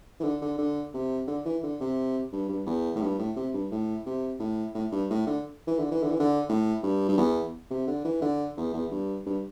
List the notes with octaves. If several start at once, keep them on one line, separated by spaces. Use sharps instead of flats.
E3
D3
D3
D3
C3
D3
E3
D3
C3
G2
G2
E2
A2
G2
A2
C3
G2
A2
C3
A2
A2
G2
A2
D3
E3
D3
E3
D3
E3
D3
A2
G2
G2
E2
C3
D3
E3
D3
E2
E2
G2
G2